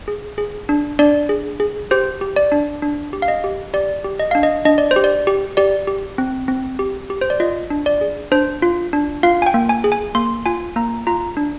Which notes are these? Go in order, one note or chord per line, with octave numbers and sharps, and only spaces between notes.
G#4
G#4
D4
D4 D5
G#4
G#4
G4 C5
G4
D5
D4
D4
G4
F5
D#5
G4
G4 D5
G4
D#5
D4 F5
D#5
D4 D#5
D5
C5
G4
D5
G4
G4 D5
G4
C4
C4
G4
G4
C5
D5
F4 D#5
D4
D5
G#4
D4 C5
F4
D4
F4 F5
G#5
G5
A#3
G#5
G#4
G#5
A#3 C6
F4 G#5
A#3 A#5
F4 A#5
D4